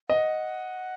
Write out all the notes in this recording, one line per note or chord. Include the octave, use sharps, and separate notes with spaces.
D#5 F#5